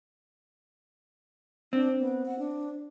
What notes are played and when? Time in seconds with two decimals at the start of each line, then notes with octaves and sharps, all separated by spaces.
1.73 C4 D4
1.99 B3
2.26 F#5
2.39 D4